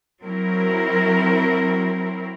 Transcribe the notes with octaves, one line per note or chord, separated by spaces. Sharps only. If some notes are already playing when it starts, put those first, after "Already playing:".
F#3 C4 E4 A#4